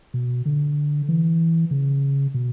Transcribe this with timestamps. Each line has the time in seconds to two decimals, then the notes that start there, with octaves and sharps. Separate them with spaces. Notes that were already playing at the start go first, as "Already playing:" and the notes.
0.14 B2
0.46 D3
1.09 E3
1.71 C#3
2.34 B2